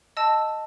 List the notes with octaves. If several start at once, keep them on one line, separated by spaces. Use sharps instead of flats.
D#5 A5 E6